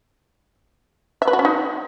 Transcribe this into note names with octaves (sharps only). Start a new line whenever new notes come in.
E5
B4
F#4
C#4
D#4